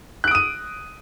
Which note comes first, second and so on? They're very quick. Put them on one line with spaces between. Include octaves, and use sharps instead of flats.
F#6 D7 D#6 D#7